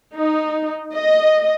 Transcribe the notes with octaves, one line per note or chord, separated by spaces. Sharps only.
D#4
D#5